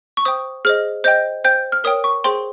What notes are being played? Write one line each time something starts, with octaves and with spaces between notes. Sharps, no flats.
C#6
C5 G5 D#6
G#4 C5 D#5 F6
C5 D#5 G5 G6
C5 G5 G6
F6
A#4 C#5 G5 D#6
C#6
G#4 C5 G5 C6